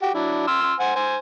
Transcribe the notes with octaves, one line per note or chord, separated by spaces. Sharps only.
F#4 G4
F#3 D4 E4
C6 E6 F6
C5 F#5 G#5
C5 G#5